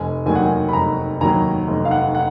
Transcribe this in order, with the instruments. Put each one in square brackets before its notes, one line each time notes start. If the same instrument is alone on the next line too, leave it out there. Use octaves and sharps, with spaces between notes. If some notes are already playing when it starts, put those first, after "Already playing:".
Already playing: [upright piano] F1 G#5
D#2 D#3 F#3 G#5
F#5
G#5
B5
F1 A#5
D#2 D#3 F#3 A#5
F1
F5
F#5
F#5